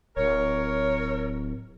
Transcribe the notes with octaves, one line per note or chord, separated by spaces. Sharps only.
D1 A#4 C#5